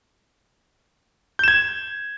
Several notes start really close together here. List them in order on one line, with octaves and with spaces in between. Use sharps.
G6 E7 G#6